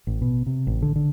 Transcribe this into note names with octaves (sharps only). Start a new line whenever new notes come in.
A1
B2
C3
A1
D3
D3